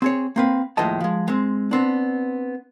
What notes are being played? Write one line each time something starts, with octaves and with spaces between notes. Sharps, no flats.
C4 G#4 C#5
A#3 C4 B4
D#2 A2 F3 G#3 D#5 A5
F3 G#3
G#3 C4
B3 C4 D4